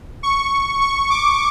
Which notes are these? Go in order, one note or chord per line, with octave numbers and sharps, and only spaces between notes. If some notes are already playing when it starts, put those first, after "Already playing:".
C#6
C#6
D6